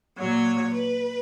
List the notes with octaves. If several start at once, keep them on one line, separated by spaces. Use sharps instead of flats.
A#2 F#3 C#5
B4